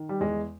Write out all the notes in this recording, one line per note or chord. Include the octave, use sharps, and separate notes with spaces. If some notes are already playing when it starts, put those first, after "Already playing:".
Already playing: D#3
G3
E2 G#3